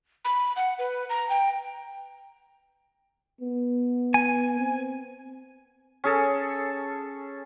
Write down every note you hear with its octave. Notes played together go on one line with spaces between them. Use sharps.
B5
F#5
B4
A#5
G5
B3
G#5
C4
C#4 G#4 A4